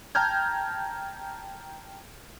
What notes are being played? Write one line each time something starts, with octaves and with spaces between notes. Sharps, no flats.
G5 A5 A#5 F6 G6 G#6